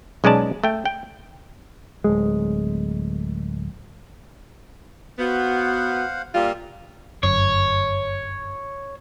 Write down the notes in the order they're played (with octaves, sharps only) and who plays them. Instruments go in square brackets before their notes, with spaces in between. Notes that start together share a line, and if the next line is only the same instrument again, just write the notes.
[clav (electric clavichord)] B1 G#3 C#4 D5 A5
A3 G5
G5
[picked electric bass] D1 G#3
[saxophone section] B3 [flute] F#4 [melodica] C5 F5 F#5
[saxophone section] A#2 G3 F4 [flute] F5
[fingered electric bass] G1 F#2 [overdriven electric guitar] C#5